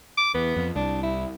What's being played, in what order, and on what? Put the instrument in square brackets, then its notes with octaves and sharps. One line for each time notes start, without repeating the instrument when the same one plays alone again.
[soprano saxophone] D6
[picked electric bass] E2 [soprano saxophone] B3
[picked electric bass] F2
[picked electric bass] C2 [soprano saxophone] D4
[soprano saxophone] E4